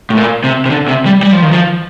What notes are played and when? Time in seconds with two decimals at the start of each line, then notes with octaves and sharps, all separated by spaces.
0.10 A2
0.17 A#2
0.44 C3
0.66 C3
0.71 D3
0.88 C3
1.06 G3
1.23 G3
1.33 F3
1.42 D#3
1.52 F3